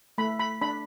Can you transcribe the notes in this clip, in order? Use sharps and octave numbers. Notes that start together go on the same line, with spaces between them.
A3 B5
B5
D4 B5